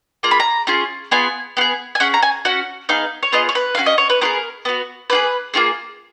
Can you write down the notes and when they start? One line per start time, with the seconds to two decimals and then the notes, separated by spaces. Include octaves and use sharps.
0.23 A#3 F4 G#4 A#5
0.31 B5
0.40 A#5
0.67 C#4 F4 G#4
1.11 B3 F4 G#4 G#5
1.57 B3 F4
1.61 G#4
1.95 G#5
2.00 C#4 G#4 F#5
2.14 A#5
2.22 G#5
2.45 C#4 F#4 F#5
2.89 B3 D#4 G#4 F5
3.23 C#5
3.32 B3 F4 G#4 D#5
3.49 C#5
3.55 B4
3.75 A#3 C#4 F#4 F5
3.86 D#5
3.98 C#5
4.10 B4
4.21 B3 F4 G#4 A#4
4.65 B3 F#4
5.10 A#3 F4 G#4 B4
5.54 A#3 C#4 F4 G#4